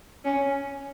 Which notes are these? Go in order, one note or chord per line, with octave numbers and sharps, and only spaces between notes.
C#4